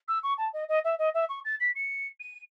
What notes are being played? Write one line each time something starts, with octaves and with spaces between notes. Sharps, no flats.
E6
C#6
A5
D#5
D#5
E5
D#5
E5
C#6
A6
B6
C#7
D#7